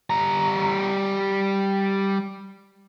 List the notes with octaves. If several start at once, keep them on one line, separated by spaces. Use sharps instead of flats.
G3 A#5